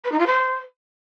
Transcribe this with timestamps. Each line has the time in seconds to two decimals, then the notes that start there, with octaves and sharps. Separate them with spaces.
0.04 B4
0.12 D#4
0.19 F4
0.26 C5